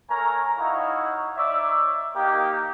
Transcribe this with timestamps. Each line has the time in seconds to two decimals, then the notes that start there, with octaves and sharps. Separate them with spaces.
0.10 A3 A#4 C#5 G#5 A#5
0.59 D#4 E4 F#4 C#5 E5 F5
1.37 D#4 C#5 D5 E5
2.15 A#3 D#4 G4